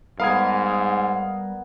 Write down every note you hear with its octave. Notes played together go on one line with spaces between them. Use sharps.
G#2 G3 B3 A#4 F5 D#6 G#6